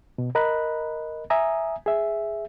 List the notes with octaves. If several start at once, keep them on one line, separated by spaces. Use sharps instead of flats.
B2
A#4 D#5 A#5 B5 F#6
E5 G#5 A#5 D#6
G#4 E5